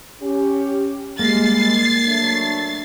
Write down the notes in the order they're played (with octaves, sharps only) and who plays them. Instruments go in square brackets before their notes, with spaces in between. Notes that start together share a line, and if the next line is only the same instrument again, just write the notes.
[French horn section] C#4 G4
[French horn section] G3 G#3 [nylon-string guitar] A#3 [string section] A6 C7
[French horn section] F#3 A3 D4